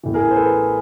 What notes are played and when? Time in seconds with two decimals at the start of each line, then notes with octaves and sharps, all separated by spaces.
0.03 A1 A2 E3
0.14 G#4 A#4
0.31 C5
0.36 A4 B4